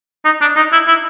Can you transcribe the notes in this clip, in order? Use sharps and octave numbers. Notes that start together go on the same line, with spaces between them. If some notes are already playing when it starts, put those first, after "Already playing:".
D#4
D4
D#4
E4
E4